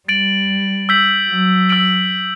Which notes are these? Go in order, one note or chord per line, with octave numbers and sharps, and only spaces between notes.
G3 A6 D7 F#7
E6 G6 B6 F#7
F#3
E6 A6 D7 F#7